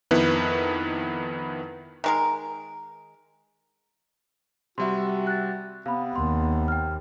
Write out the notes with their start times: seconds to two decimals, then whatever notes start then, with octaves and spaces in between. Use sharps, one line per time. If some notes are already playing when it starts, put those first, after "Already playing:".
0.11 F2 D#3 B3 E4 B4
2.04 D#3 G#3 A#4
4.78 C3 G3 F#4 E5 C6
5.27 F#6 A6
5.86 C3 B3 F5 B5
6.15 D#2 C6
6.68 G5 F6